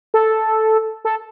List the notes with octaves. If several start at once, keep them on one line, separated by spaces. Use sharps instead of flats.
A4
A4